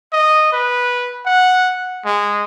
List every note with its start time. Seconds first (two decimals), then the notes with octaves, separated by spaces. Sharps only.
0.13 D#5
0.53 B4
1.26 F#5
2.05 G#3